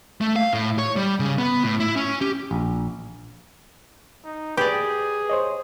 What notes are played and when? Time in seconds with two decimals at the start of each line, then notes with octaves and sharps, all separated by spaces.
0.21 A3
0.36 F5
0.53 A2
0.78 C#5
0.96 G3
1.20 C#3
1.38 B3
1.63 A2
1.80 E4
1.96 C#4
2.21 G4
2.51 A#1
4.24 D#4
4.57 G4 G#4 B4 D5
5.29 C5 C#5 D#5